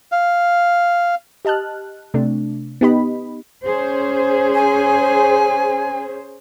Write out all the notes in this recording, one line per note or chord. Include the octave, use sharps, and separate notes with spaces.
F5
G4 D#5 A5 F6 F#6
C3 A3 D4
B3 D#4 G4 D#5 B5
C#4 G#4 C5
G#5